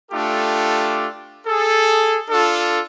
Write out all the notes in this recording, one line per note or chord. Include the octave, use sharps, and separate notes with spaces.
A3 D4 F4 G4 A4
G#4 A4
D4 F4 A4